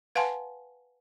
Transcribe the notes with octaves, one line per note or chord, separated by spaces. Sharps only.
B4 F5 F#5 G#5 A5 C6